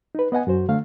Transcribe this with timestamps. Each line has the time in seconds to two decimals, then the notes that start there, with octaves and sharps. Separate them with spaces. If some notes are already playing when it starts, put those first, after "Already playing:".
0.15 D#4 B4
0.32 B3 D#5 F#5 G#5
0.47 F#2 F#4 C5
0.69 D3 A3 F5